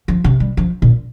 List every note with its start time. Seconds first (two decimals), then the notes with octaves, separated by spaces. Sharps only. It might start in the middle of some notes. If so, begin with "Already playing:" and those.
0.08 F3
0.24 C3
0.40 G3
0.57 F3
0.82 A#2